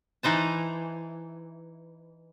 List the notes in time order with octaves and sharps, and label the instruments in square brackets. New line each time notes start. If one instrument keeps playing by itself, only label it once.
[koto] E3 D#4 C5 A5